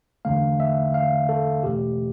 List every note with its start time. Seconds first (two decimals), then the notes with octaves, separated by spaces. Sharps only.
0.25 E2 D3 A3 F5
0.60 E5
0.94 F5
1.29 A4
1.63 E2 B2 A3 G4